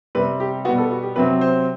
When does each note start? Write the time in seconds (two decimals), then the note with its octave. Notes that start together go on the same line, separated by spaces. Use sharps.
0.15 C3 G3 C4 B4
0.40 G4
0.65 B2 G3 B3 F#4
0.78 A4
0.91 F#4
1.03 G4
1.16 C3 F#3 C4 B4
1.41 C5